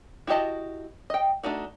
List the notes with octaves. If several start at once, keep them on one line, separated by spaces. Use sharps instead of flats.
E4 F#4 G4 D#5 A5
D#5 G5
A3 D4 D#4 F#4